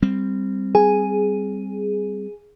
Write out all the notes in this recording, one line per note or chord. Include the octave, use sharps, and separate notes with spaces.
G3 C4
G#4 G#5